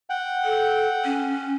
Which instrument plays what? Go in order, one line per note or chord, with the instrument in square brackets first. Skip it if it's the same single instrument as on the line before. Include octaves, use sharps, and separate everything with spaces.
[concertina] F#5 G5
[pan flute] A4
C#4